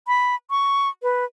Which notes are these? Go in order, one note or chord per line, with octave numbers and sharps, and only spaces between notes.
B5
C#6
B4